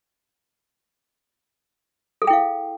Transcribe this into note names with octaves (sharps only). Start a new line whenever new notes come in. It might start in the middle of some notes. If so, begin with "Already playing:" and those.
E4 G#4 A4 F5 G5